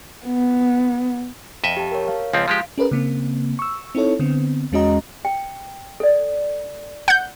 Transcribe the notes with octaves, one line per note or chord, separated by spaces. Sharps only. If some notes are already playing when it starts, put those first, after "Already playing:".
B3
F2 D#5 E5
G4 A5
A#4 C#5
F5
C#2 F3 C4 F5
F3 G#3 G4
C#4 G#4 A#4 B4
C#3 A#3 C4
C#6 E6
C4 D#4 E4 A4 C#5
D3 B3 C4
E2 G#3 C#4 F#4 D#5 A#5
G5
A4 D5
F#5 G6